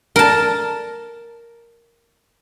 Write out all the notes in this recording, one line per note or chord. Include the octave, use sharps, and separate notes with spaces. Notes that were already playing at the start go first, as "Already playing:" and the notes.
A#4 A5